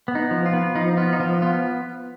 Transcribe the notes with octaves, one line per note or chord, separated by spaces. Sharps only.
B3
D#4
F3
F4
B3
F3 D#4
B3 F4
D#4
F3 F4
B3 F4